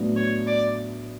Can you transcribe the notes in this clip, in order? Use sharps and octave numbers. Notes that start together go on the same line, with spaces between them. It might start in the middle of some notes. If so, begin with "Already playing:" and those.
Already playing: A2 F#3 B3 D4
C#5
D5